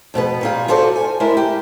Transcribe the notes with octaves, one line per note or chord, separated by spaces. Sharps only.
F2 B2 B3 B4
A#2 G3 F4
F4 F#4 A4 C5 D5
G#5
G#3 D4 E4 A#4
G4